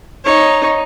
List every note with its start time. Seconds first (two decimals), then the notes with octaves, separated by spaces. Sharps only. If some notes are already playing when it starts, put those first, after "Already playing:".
0.25 D#4 C#5